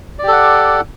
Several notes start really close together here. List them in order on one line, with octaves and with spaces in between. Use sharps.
D5 G4 A4 F#5